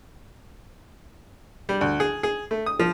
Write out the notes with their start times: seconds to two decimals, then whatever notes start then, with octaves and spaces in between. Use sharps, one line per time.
1.69 G3
1.81 D2
2.00 G#4
2.23 G#4
2.51 A3
2.66 D#6
2.79 F3